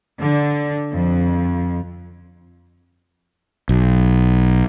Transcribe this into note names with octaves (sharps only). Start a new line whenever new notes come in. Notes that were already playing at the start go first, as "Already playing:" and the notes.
D3
F2
B1